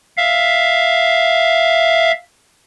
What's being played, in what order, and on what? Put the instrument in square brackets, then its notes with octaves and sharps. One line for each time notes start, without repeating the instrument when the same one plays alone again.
[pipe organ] E5 F5